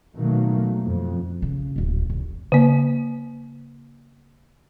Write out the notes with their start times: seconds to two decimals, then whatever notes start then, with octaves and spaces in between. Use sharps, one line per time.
0.15 B2 D#3 F#3 A3 A#3
0.83 F2
1.42 C#3
1.76 D1 A#2
2.10 F1
2.52 C#3 A#3